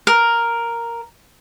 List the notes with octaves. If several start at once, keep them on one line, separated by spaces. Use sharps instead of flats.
A#4